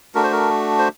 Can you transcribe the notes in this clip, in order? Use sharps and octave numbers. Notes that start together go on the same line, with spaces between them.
A3 D4 F#4 A#4
C5
A#4
C5